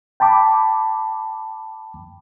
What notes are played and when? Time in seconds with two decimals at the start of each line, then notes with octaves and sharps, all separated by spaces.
0.20 G5 A5 B5 D6